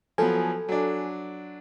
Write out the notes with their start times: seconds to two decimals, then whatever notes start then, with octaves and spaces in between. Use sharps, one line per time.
0.18 F3 F#3 B3 A4 G#5
0.69 F#3 D4